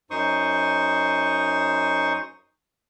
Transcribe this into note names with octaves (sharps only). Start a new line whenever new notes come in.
F#2 D#4 C5 C6 C#6 D#6